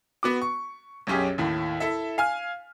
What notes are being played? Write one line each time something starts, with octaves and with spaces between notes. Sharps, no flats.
B3 F#4 D6
C#6
B1 F#2 C#4 G4 G#4
D#2 A2
E4 A4 E5
F5 G#5 F6